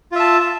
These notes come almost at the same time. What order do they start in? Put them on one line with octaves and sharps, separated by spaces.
F4 E5 A5